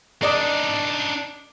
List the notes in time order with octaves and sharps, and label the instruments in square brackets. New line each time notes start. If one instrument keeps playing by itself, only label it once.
[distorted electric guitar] D4 D#4 [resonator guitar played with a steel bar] A#4 D5 D#5